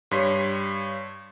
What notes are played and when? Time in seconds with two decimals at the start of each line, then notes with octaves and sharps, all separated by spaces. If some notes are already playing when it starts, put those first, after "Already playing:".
0.11 G2 G3 C#5 C6 B6